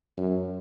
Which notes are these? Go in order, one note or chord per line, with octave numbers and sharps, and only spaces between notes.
F#2